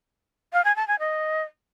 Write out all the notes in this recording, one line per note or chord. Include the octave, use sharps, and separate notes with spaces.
F5
G#5
A5
G#5
D#5